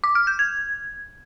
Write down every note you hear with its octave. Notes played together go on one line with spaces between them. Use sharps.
D6
F6
G6
G#6